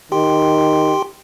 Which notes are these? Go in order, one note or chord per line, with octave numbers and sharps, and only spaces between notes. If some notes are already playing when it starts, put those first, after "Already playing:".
D#3 G4 G5 C6